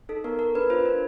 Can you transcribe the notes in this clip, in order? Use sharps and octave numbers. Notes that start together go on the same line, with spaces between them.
D#4 A4
B3 A#4
A4 A#4
D4 B4
F4 C5
D4